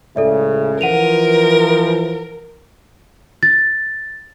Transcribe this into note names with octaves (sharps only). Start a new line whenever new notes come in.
C#2 A2 C#3 A4 D5 E5
E3 F3 A#4 F#5 D#7 F7
A6